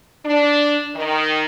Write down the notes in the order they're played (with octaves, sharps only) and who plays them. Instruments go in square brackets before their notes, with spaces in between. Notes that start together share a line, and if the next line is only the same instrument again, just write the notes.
[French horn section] D4
D#3